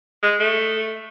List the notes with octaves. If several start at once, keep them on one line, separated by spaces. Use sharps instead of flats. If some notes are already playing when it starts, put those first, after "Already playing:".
G#3
A3